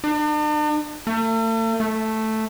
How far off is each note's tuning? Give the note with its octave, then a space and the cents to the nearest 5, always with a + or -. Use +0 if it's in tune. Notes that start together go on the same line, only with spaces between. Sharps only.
D4 +45
A3 +40
A3 +0